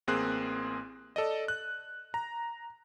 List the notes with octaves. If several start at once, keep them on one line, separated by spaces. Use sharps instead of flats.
A1 A#3 C4 G#4 C6 F#6
A4 D5 D#5
F#6
A#5